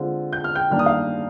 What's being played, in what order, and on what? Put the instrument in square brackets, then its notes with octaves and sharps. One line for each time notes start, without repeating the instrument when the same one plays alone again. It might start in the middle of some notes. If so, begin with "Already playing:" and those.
Already playing: [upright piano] D3 G#3 C4 F4
G6
F6
G5 G6
G2 D#3 A#3 D4 F6
D#6
F5 F6